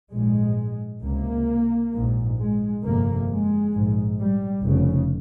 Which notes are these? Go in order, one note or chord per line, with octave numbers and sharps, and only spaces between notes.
A#1 G#2 G#3
C#2 C3 A#3
A#1 G#2
G#3
G1 F2 C3 A#3
G#3
A#1 G#2
G3
F1 F2 C#3